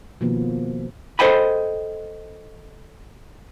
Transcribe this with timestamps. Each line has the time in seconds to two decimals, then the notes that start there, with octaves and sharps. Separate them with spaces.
0.21 B2 D#3 F3 A#3 B3
1.19 A4 C5 D#5 G5 G#5 B5